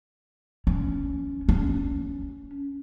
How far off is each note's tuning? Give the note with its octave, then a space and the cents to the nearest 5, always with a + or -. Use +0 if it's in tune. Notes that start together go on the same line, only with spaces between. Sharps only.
C#4 +10
C#4 +10